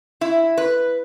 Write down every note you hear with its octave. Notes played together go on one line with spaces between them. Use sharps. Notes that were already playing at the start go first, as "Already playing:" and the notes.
E4
B4